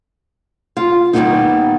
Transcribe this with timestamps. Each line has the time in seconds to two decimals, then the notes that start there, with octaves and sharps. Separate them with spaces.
0.77 F4
1.13 D#3 G3 G#3 A#3 B3 D#4